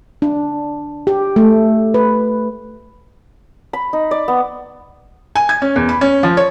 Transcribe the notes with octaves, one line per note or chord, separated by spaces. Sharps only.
D4
G4
A3
B4
B5
D#4
D5
B3
G#5
G#6
C#4
E2
B5
C#4
F3
C#5